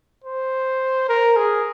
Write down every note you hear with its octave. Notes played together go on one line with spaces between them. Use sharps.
C5
A#4
G#4